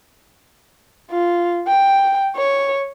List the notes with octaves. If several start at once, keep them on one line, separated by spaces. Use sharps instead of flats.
F4
G5
C#5